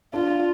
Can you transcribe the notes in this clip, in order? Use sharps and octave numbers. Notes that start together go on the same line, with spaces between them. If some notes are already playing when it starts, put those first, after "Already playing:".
D4 F4